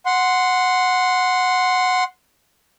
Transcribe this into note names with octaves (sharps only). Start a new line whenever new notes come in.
F#5 C6